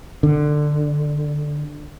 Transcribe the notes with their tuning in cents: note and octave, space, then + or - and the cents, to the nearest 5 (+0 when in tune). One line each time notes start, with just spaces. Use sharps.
D3 +15